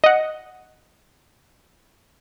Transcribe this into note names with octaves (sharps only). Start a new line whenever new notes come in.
D#5 F#5